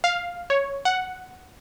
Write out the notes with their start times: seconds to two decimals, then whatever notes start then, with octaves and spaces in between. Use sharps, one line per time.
0.04 F5
0.50 C#5
0.85 F#5